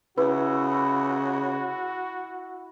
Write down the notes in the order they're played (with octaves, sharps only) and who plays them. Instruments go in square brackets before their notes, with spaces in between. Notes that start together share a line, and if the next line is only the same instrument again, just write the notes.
[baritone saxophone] C#3 [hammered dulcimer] E4 [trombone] F#4 [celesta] B4